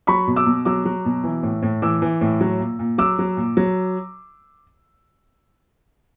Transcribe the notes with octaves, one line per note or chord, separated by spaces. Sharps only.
F#3 B5 C#6
B2
D6 E6
B2
F#3 D6 E6
F#3
B2
E3
A2
A2
E3 D6 E6
E3
A2
F#3
A#2
A#2
F#3 D6 E6
F#3
A#2
F#3